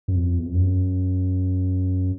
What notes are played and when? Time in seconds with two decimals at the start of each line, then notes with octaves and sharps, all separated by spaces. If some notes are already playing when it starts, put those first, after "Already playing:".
0.08 F#2
0.15 F2
0.39 E2
0.46 F2
0.54 F#2